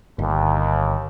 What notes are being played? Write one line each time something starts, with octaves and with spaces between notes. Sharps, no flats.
G1 D#2